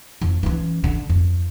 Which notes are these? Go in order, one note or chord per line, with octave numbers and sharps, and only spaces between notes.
F2
E3 C#4
D3
F2